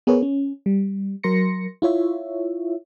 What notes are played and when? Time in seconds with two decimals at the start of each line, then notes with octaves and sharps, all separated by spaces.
0.07 B3 G#4 A#4 B4 C#5
0.22 C#4
0.66 G3
1.23 F#3 A#4 C6 A#6 C#7
1.82 E4 F4 C#5 E5